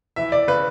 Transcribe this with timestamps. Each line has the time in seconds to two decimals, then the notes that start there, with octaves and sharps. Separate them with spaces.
0.16 E3 E5
0.32 D5
0.48 C#3 B4